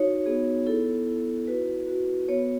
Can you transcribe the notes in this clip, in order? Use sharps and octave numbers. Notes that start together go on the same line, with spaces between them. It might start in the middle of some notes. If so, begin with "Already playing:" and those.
Already playing: D#4 F#4 C#5
B3 G#4
E4 A4
E4
F#4 B4
F#4
B3 C#5